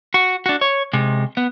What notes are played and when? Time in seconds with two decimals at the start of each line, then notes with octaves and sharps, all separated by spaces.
0.14 F#4
0.46 D4 F#4
0.61 C#5
0.93 C3 G#3
1.37 B3